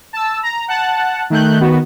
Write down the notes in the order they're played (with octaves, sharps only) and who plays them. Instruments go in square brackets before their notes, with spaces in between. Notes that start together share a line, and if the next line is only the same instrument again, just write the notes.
[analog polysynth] A5 E6
A#5
F#5 A5 F#6
D#3 A3 F#6 G6
D#3 B3 F#4